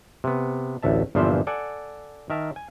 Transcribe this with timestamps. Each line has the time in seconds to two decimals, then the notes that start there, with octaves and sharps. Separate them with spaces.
0.24 C3 B3
0.83 A1 D2 E5 A5
1.15 G1 A#2 E3 F3 C5 E5
1.47 A4 D5 F#5 G#5
2.30 D#3 A#4 E5 A5
2.56 G#5